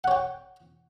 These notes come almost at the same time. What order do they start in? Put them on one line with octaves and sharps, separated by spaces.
F#5 C#5 G5